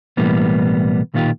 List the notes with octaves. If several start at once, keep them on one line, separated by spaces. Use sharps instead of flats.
B1 A2 E3 G3 A#3 B3
B1 A#2 D#3 D4 F4 G4